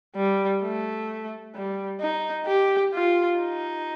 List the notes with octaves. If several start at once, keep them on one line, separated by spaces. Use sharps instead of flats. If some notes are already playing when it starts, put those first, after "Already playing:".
G3
A3
G3
D#4
G4
F4
D#4